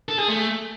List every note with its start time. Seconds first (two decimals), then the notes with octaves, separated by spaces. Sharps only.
0.09 A4
0.19 G#4
0.28 A3